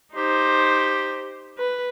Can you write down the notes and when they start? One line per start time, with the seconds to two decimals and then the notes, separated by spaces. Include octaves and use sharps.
0.14 D#4 G4 C5
1.58 B4